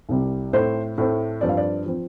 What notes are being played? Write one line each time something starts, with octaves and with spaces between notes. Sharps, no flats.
C2 C3 G3
A2 A3 C4 C5
A2 A3 C4
G2 F3 C4 D5
F5
D5
F3 C4